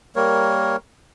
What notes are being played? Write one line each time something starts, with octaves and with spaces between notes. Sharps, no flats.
G3 A#3 A#4 C#5